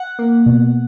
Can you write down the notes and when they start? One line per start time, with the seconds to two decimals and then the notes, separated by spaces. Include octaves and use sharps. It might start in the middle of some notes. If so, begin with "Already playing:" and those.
Already playing: F#5
0.19 A#3
0.46 B2